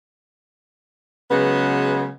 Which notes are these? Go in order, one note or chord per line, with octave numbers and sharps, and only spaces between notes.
C#3 F#3 G#3 B3